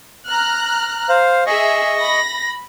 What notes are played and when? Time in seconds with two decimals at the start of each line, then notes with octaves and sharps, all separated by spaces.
0.27 A#5 F6 F#6
1.09 C5 F5
1.47 G#4 D#5 E5 C#6
2.00 B5 A#6